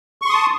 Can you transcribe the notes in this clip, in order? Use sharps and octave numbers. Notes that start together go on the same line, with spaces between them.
A5 C6 C#6 D#6